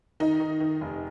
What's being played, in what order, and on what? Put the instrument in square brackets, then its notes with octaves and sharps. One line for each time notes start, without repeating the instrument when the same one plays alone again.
[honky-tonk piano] D#3 D#4
D#3
D#3
F1